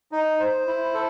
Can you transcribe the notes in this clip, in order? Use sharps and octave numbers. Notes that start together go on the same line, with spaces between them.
D#4
C5
E4
A4